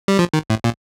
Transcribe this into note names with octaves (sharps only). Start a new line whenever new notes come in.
G3
F3
D#3
A2
A#2